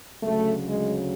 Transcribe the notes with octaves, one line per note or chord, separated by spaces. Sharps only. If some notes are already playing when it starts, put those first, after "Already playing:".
D2 C#3 F#3 A3
G#3